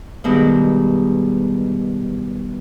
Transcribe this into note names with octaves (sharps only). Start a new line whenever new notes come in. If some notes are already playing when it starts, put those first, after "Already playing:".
G2 B2 D#3 G#3